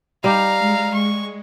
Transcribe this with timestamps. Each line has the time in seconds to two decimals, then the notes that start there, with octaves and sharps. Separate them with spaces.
0.24 G3 D#4 G4 F5 A#5
0.59 G#3
0.94 C#6